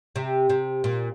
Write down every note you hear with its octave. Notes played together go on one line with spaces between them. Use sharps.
C3
C3
A#2